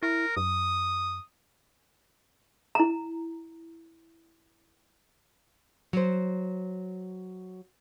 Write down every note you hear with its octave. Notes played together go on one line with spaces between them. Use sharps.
E4 A#4
F#2 D#6
E4 A#5
F#3 C5